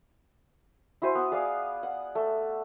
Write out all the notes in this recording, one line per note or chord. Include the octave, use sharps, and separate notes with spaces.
E4 F#4 C5 G#5
B3
G#4 D5 F5
F#5
A3